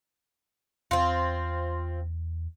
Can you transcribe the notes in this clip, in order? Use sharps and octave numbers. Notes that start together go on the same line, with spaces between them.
E2 C4 F4